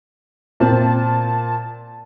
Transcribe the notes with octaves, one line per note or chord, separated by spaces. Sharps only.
A#2 C4 A5